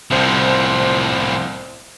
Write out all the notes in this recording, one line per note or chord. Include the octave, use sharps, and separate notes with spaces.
C2 A2 F3 C5